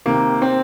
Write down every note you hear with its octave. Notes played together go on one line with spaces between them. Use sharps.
C3 D#3 A#3
C4